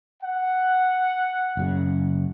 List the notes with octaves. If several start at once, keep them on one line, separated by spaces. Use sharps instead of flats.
F#5
F#1 F#2 C#3